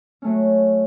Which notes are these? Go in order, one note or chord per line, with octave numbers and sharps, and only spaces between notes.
F#3 A3 C#4